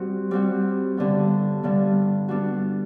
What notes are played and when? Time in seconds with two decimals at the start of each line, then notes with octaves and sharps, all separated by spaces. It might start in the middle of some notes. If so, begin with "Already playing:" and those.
Already playing: G3 C4 F#4
0.31 G3 C4 F#4
0.97 G2 D3 G3 B3
1.63 G2 D3 G3 B3
2.29 G3 B3 D4 F#4